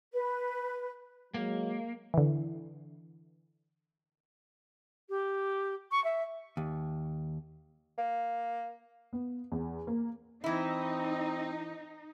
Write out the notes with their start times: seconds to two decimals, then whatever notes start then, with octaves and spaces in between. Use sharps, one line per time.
0.13 B4
1.34 F#3 G#3 A#3
2.14 D3 E3
5.09 G4
5.91 C#6
6.04 E5
6.57 D#2
7.98 A#3
9.13 B3
9.52 E2
9.87 A#3
10.44 E3 C4 D#4 E4